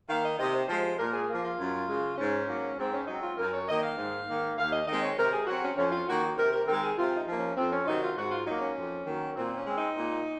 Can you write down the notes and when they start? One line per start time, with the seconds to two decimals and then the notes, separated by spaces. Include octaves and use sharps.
0.09 D#3 A#3 F5
0.24 D#5
0.39 C3 D#5
0.54 C5
0.68 F3 G#3 C5
0.84 C5
0.98 A#2 A#4
1.13 G#4
1.28 F3 A#3
1.43 F4
1.59 F#2
1.89 C#3 G#3
2.18 G#2 C#4
2.48 F#3 A#3
2.78 G#2 C4
2.93 C#4
3.08 F#3 C4 D#4
3.23 F4
3.37 F#2 A#4
3.53 C#5
3.68 D#3 A#3 D#5
3.83 F5
3.97 G#2
4.28 D#3 A#3
4.57 D#2 F5
4.72 D#5
4.87 D#3 G#3 C4 D#5
5.02 C#5
5.17 C3 A#4
5.32 G#4
5.47 F#3 C4 F#4
5.62 C#4
5.77 F2 C#4
5.92 F4
6.07 D#3 A#3 F#4
6.37 C3 A#4
6.52 A#4
6.67 D#3 G#3 C4 A#4
6.82 G#4
6.97 C3 F4
7.17 D#4
7.27 F3 A#3
7.37 C#4
7.57 F2 C4
7.72 C#4
7.82 F4
7.86 C3 D#3 F#3 C4 D#4
8.02 F4
8.17 G#2 F#4
8.31 F4
8.46 F#3 A#3 D#4
8.61 C#4
8.76 F2
9.06 D#3 F#3 A#3
9.36 A#2 C4
9.56 C#4
9.66 G#3 C4
9.77 D#4
9.96 A#2